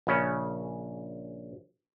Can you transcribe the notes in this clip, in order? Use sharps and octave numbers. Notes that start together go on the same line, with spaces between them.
A#1 C#3 C#4